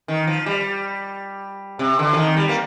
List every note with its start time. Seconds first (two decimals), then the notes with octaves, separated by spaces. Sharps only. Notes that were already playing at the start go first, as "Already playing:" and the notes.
0.08 D#3
0.27 F3
0.46 G3
1.79 C3
1.99 D3
2.13 F3
2.17 D#3
2.37 G3
2.49 A#3